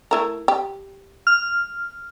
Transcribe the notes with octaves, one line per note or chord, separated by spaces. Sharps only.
A3 E4 A#4
G4
F6